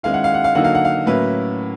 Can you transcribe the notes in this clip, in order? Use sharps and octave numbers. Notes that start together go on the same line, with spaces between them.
D#3 G#3 C#4 E4 F5
F#5
F5
F#5
F5
D3 F#3 A#3 D#4 F#5
F5
F#5
F5
A2 F#3 A#3 C#4 E4 B4